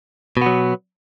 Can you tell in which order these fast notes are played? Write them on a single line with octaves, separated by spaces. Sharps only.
B2 B3 F#3